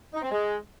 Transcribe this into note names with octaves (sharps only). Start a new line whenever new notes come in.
D#4
C4
G#3